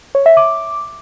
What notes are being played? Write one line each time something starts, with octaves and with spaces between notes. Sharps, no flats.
C#5
E5
D6